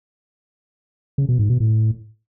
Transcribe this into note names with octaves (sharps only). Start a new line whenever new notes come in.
C#3
B2
G#2
B2
A2